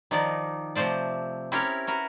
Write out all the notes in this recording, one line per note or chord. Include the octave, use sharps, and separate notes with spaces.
D#3 F3 D#4 D5
C3 F3 A3 C5 D5
C4 C#4 E4 G4 A#4 C#5
F#4 A#4 B4